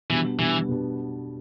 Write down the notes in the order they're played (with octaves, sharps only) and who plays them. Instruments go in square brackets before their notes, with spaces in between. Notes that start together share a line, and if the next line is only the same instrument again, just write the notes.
[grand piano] B2 G3 B3 D4 [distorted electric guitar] E3
[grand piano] B2 G3 B3 D4 [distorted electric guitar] E3
[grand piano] B2 G3 B3 D4